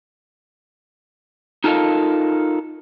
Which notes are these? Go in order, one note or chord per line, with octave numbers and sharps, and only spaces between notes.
D#4 F4 A4 A#4 D#5 F5